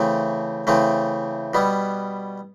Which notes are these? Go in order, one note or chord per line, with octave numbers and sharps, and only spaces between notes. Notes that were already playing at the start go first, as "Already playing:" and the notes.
Already playing: C#3 E3 A3 C4
C#3 E3 A3 C4
B2 G3 B3